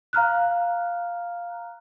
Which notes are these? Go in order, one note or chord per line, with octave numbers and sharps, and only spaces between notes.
F5 A#5 F6 F#6